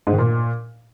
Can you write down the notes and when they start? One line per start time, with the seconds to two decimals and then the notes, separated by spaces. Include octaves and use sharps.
0.07 G#2
0.13 D#3
0.19 A#2